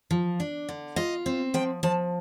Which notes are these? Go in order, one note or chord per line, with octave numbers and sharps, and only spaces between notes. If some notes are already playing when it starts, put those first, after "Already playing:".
F3
D4
D3
F4 D#5
C4
F3 G5
F3 A5